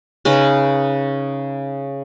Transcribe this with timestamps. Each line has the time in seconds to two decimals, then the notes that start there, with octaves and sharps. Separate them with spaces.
0.25 C#3 C#4 D#4 B4